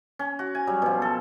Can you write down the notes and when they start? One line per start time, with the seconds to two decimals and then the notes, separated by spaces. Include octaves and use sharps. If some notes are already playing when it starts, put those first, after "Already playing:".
0.19 C#4
0.39 F#4
0.55 G#5
0.67 F#3 G3
0.82 B2 F3
1.02 A4